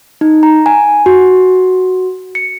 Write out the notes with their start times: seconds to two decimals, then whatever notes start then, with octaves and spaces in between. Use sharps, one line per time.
0.21 D#4
0.43 A#5
0.66 G#5
1.06 F#4
2.35 C#7